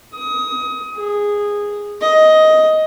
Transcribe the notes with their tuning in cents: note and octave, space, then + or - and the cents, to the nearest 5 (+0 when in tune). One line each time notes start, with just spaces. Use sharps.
D#6 +25
G#4 -10
D#5 +10